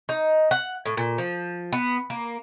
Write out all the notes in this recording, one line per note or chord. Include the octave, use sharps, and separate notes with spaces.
D#4
F#5
A2
A#2
F3
B3
A#3